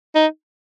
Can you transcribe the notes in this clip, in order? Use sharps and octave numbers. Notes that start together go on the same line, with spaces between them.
D#4